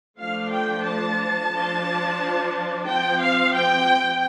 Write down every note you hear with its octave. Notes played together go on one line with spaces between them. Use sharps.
F3 A3 D4 F5
G5
A5
F3 D4
F3 C4 G5
F5
G5